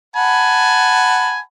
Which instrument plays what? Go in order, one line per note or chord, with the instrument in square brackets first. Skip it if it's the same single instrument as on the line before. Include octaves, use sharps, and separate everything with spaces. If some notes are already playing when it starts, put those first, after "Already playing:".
[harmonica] F#5 A5 B5 [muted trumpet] G#5